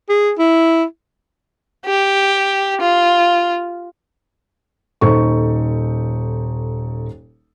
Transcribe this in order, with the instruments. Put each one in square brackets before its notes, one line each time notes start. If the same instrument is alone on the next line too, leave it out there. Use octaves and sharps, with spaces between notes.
[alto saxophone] G#4
E4
[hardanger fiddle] G4
F4
[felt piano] D#1 D#4 A4 C5 C#6